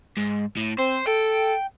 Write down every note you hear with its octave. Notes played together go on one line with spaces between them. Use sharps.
G#2
A2
C4 C5
A4 G5